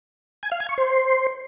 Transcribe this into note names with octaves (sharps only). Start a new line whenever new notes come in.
G#5
F5
G#5
C#6
C5